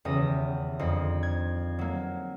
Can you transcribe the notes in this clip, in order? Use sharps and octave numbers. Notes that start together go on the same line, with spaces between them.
D#1 E2 C#3 G4 D#6 A#6
F2 D3 C4 D#4
G#6
F#3 A#3